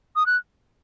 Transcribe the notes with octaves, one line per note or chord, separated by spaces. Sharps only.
D#6
F#6